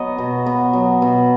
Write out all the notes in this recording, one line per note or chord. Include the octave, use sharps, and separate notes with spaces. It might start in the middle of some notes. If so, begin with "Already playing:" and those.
Already playing: F#3 B3 C#5 D#5
B2
B3
F#3
B2